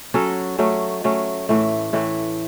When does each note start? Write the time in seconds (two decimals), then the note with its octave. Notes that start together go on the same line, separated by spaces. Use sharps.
0.14 F#3 C#4 F#4 A4
0.59 F#3 A3 C#4
1.04 F#3 A3 C#4
1.49 A2 E3 A3
1.93 A2 E3 A3